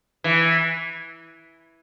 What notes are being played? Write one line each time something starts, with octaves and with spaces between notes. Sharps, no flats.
E3